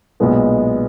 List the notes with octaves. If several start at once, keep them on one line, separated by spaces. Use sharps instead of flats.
B1 A#2 G#3 B3